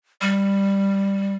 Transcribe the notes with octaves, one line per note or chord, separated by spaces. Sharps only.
G3